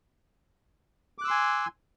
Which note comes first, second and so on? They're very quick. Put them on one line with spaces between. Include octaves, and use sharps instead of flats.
D6 F#6 E6 C6 G#5